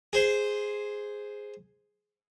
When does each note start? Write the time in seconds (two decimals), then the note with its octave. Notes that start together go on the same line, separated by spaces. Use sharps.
0.13 G#4 C5